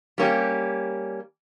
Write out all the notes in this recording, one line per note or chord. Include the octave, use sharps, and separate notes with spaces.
G3 A#3 C#4 G4